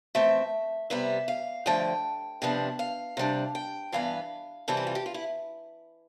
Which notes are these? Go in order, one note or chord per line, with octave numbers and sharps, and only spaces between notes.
F2 E3 A3 C4 E5
C3 G3 B3 E5
F5
G2 D3 F3 A3 G5
C3 F3 B3 D4
F5
C3 G3 D4
G5
G2 E3 B3 F5
C3 E3 G3 C4 A4
G4
F4
G4
F4
E4